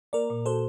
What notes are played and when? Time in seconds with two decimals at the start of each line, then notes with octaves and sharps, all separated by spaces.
0.13 A#3 A#4 D5
0.30 A#2
0.46 F#4 A4 C5